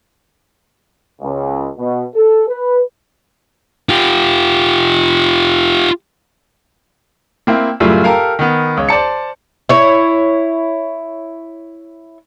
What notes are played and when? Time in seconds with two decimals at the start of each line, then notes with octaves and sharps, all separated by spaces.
1.21 C#2
1.78 B2
2.15 A4
2.49 B4
3.89 F4 G4
7.47 A#3 C4 E4
7.80 F#2 A2 C#3 G3 E4 F4
8.04 G4 A4 A#4 F5
8.39 D#3 B3
8.77 C#2 C#5
8.89 C5 D5 A5 C#7
9.69 E4 C#5